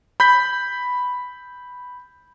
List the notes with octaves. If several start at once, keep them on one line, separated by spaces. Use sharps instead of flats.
B5 G6 B6